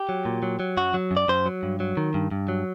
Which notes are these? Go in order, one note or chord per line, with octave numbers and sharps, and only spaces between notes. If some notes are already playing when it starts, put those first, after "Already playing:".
Already playing: G4
F#3
A#2
F#3
F#3
F#2 F#4
F#3
F#2
D5
F#2 C5
F#3
G2
F#3
D#3
G2
G2
F#3